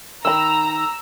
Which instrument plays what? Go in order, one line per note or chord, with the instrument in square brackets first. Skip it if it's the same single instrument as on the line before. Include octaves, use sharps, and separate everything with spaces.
[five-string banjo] D#3 B5 [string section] A#5 [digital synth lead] E6